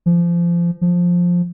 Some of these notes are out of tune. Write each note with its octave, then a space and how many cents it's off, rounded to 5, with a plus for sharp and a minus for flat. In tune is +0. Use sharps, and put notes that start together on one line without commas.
F3 -25
F3 +10